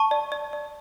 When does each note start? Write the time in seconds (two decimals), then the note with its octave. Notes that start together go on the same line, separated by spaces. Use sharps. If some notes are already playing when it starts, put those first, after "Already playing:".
Already playing: A5 C#6
0.11 D5
0.32 D5
0.53 D5